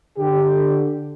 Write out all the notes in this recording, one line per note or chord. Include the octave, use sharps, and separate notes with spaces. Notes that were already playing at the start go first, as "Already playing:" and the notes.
D3 G4